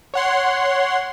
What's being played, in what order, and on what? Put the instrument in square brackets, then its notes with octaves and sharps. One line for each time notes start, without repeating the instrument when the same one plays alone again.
[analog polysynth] C#5 F#5 C6